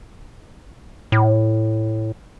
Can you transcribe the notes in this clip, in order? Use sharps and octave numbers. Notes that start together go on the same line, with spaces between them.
A2